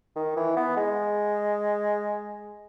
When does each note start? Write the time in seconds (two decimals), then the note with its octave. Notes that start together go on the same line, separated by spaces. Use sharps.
0.16 D#3
0.36 E3
0.56 B3
0.77 G#3